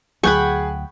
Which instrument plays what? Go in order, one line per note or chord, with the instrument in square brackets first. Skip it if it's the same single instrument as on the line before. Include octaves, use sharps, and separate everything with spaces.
[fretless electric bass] D2 F#3 [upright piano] G#4 [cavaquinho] F#5 G5 [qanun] B5 C#6